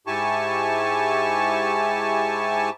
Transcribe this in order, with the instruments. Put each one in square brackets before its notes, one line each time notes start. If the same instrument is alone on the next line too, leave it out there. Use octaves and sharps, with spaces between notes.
[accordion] G#2 E4 G4 G#5 A5 C#6